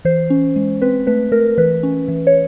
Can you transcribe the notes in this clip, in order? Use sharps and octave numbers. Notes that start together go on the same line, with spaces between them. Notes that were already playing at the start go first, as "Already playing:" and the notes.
E3 C5
C#4
G#3
C4 B4
A3 B4
A3 A#4
E3 B4
C#4
E3
C#5